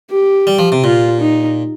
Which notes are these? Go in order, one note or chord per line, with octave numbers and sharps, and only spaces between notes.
G4
G3
F3
C3
A#2 F4
D#4